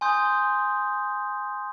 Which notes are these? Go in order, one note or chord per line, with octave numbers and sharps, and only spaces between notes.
G#5 C6 D#6 G6